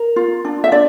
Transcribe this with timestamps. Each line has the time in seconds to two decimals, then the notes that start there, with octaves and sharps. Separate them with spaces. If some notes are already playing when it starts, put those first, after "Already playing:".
Already playing: A#4
0.16 F4
0.45 D4
0.64 E5
0.71 D4 D5